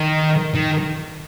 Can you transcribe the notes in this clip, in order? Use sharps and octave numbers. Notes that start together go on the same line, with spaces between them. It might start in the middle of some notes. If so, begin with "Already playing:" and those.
Already playing: D#3
D#3